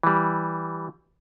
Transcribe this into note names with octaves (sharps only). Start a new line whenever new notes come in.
E3 G3